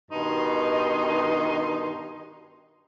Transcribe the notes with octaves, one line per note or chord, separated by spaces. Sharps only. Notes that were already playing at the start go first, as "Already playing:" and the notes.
G2 B2 D#3 D#4 C6